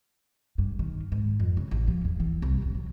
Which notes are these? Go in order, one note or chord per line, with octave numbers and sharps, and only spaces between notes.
G2
D#3
G#2
F2
C#3
A1
F3
E2
E3
C2
D1
F#3